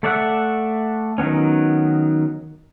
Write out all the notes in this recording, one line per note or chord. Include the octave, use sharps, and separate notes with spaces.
A3 A4 D5 E5 F#5
D#3 F#3 B3 C#4